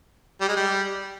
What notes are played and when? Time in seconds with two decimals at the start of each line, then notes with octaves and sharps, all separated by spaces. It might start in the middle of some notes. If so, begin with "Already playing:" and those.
0.41 G3
0.48 G#3
0.56 G3